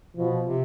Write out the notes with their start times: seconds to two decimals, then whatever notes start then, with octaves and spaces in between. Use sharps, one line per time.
0.16 B2 F3
0.45 C3